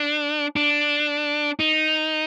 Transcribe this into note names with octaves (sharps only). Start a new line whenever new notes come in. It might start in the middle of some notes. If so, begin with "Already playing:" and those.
Already playing: D4
D4
D#4